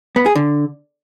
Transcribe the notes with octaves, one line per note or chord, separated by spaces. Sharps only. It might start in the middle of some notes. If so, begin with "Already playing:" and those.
B3
G#4
D3